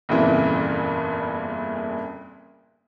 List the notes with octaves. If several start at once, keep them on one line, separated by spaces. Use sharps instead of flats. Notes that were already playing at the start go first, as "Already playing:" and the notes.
G1 F2 A#2 C#3 E3